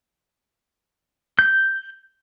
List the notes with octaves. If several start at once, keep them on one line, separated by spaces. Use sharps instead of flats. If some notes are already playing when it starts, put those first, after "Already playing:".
G6